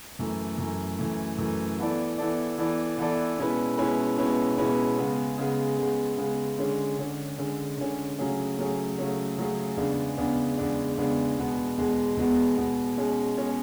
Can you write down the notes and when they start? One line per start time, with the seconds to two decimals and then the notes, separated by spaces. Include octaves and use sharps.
0.19 F#2 E3 A3
0.58 F#2 E3 A3
0.98 F#2 E3 A3
1.38 F#2 E3 A3
1.78 E3 B3 E4 A4 D5
2.18 E3 B3 E4 A4 D5
2.58 E3 B3 E4 A4 D5
2.98 E3 B3 E4 A4 D5
3.38 B2 G#3 C#4 E4 B4
3.78 B2 G#3 C#4 E4 B4
4.18 B2 G#3 C#4 E4 B4
4.58 B2 G#3 C#4 E4 B4
4.98 C#3 G#3 B3
5.38 C#3 G#3 B3
5.78 C#3 G#3 B3
6.18 C#3 G#3 B3
6.58 D3 G#3 C#4
6.98 D3 G#3 C#4
7.38 D3 G#3 C#4
7.77 D3 G#3 C#4
8.18 C#3 F#3 A3 C#4 G#4
8.58 C#3 F#3 A3 C#4 G#4
8.98 C#3 F#3 A3 C#4 G#4
9.38 C#3 F#3 A3 C#4 G#4
9.77 E2 C#3 G#3 B3 D4
10.17 E2 C#3 G#3 B3 D4
10.57 E2 C#3 G#3 B3 D4
10.98 E2 C#3 G#3 B3 D4
11.37 E2 B2 G#3 B3
11.77 E2 B2 G#3 B3
12.17 E2 B2 G#3 B3
12.57 E2 B2 G#3 B3
12.97 B2 G#3 C#4
13.37 B2 G#3 C#4